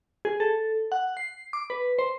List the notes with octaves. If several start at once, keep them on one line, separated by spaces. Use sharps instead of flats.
G#4
A4
F#5
C7
D6
B4
C5